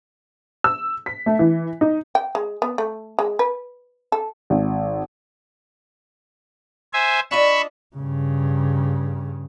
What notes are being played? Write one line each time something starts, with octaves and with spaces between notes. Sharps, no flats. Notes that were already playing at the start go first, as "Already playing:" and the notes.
E6
B6
A3
E3
D#4
G5
G#3
B3
A3
G#3
B4
A4
G#1
C5 E5 G#5
D4 F4 D#5 B5 C#6 E6
G2 C#3